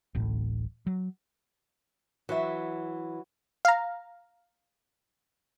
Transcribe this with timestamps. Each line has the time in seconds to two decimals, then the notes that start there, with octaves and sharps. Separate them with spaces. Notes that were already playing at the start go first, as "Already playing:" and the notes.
0.15 D1 A1 A2
0.87 F#3
2.29 E3 F#3 E5
3.65 F5 A#5